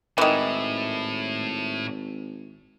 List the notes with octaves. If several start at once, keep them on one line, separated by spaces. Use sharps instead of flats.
G#1 A2 D#3 E3